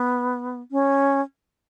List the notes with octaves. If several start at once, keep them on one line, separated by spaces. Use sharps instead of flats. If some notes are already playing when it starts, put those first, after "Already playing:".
Already playing: B3
C#4